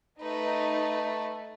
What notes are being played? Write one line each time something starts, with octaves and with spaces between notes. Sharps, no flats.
A3 D#4 B4